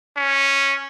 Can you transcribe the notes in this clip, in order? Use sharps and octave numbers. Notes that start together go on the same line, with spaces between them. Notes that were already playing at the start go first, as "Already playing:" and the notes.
C#4